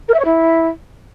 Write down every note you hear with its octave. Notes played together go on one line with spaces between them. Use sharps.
A#4
E5
C#5
E4